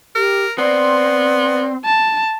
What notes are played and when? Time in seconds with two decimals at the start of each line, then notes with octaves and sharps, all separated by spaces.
0.15 G4 A#4
0.58 B3 C4 D5
1.85 A5